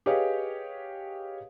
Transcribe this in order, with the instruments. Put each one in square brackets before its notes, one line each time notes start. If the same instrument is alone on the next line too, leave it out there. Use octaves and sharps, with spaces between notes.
[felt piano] G4 G#4 B4 C#5 D#5 F5